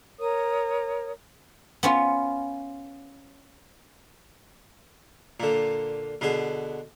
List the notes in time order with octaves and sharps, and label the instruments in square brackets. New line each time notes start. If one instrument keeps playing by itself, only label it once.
[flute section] A#4 C#5 D#6
[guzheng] B3 C#4 F4
[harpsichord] A#2 D3
B2 D3 G#4